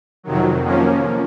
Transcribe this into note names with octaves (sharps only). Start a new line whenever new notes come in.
F2 C3 D#3 F#3
F3 A#3 C#4